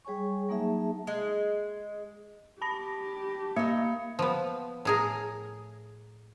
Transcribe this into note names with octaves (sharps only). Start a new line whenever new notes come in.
G3 G#4 C#5 G#5 C#6
F#3 A#3 D#4 G#4 E5 A5
G#3
G4 A5 B5 A#6
A#3 D#4 E5 C#7
F3 B3
A2 G#4 A#4